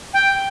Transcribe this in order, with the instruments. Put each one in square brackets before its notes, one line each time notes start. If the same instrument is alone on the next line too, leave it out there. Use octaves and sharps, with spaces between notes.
[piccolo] G5